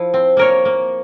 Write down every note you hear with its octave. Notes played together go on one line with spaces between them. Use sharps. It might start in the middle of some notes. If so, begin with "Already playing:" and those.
Already playing: F3 E4
C4
A#3 A#4 C#5
A#3